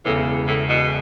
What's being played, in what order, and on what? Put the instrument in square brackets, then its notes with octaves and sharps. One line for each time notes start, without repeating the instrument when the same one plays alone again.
[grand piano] E1 E2 C#3 E3 [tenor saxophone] A2
[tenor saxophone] A2
B2